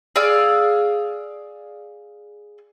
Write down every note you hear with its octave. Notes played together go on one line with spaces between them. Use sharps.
G#4 D5 F5 E6